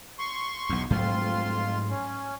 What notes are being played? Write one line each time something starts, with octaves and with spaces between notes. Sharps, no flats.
C6 C#6
B1 E2
F2 G#2 F#3 A3 F4 C6
C#4